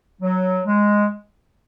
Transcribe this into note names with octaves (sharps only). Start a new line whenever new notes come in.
F#3
G#3